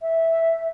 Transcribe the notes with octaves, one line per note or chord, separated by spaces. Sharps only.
E5